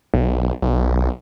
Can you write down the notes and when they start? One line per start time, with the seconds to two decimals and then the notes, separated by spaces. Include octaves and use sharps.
0.14 B1
0.62 B1